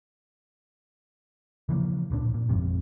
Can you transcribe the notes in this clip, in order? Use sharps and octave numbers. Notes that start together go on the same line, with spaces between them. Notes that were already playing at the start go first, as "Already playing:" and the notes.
C#3 E3 F3 A#3
D1 G2 A#2 D4
A#2
G#1 F2 G#2 C3